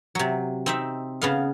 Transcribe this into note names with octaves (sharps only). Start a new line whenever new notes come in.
C3 F#3
C4 D#4 E5
C#3 B3 F5